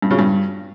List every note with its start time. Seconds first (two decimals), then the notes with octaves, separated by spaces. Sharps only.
0.02 G2
0.11 C#3
0.19 G2